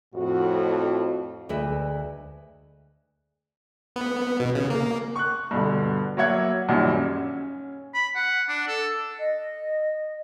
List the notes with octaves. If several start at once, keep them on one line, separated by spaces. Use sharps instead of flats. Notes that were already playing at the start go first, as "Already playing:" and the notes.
F2 A2 F#4
D2 G#3 B4 E5
B3
B2
C#3
A#3
C#6 F#6
G2 B2 D3
F#3 A#3 C#5 E5 F#5 G#6
F#2 A#2 D#3 F#3 G3
C#4
B5
F#5
D4
A4
D#5